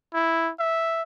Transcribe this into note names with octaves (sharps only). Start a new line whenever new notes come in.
E4
E5